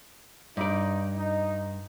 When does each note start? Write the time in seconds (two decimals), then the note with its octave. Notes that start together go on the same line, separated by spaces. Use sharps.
0.57 G2 D#4 D5
1.17 D#4